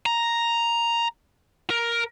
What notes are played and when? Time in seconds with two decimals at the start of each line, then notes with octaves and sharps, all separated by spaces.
0.06 A#5
1.70 A#4